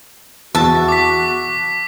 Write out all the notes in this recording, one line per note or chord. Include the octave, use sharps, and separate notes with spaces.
E2 F#4 E5 A5
D6 B6